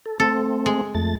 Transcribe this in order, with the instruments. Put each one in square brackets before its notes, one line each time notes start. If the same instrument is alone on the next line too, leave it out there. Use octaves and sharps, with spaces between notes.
[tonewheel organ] A4
[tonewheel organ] A3 C4 [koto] A4
[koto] G#3
[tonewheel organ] F2 A3 A6